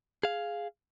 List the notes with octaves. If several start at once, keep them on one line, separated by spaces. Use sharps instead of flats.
G#4 F5